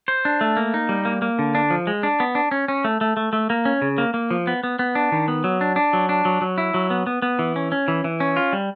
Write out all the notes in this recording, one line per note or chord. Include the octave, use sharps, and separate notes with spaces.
C5
D4
A3
A#3
D#4
G3
A#3
A#3
D3
D4
F3
G#3
D4
B3
D4
C#4
C#4
A3
A3
A3
A3
A#3
C#4
C#3
A#3
A#3
F3
B3
B3
B3
D4
D#3
B3
F#3
D4
D4
F#3
D4
F#3
F#3
E4
F#3
B3
B3
B3
E3
C#4
C#4
E3
E3
C#4
F4
G3